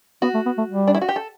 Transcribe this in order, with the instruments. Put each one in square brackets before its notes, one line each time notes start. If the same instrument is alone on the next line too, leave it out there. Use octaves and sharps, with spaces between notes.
[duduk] B3 [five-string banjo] F#4
[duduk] A3
B3
A3
G3
[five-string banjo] D4
E4
F#4
G4
A4